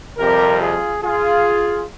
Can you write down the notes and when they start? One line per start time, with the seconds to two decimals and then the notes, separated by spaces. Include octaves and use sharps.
0.17 F2 C3 G3 G4 A#4
0.60 F4 G#4
1.02 F4 G#4